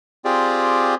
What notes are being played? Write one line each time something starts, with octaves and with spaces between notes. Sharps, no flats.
C4 F4 G4 G#4 D5